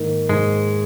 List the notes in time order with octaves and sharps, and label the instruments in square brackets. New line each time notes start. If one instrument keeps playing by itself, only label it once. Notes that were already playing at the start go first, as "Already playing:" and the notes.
Already playing: [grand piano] G#2 D#3 A#3 D#4
[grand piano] G#2 [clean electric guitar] G#3